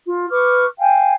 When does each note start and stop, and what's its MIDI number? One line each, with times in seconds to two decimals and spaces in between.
0.06 0.25 65
0.29 0.65 71
0.29 0.65 85
0.29 0.65 86
0.29 0.65 89
0.79 1.13 77
0.79 1.13 79
0.79 1.13 80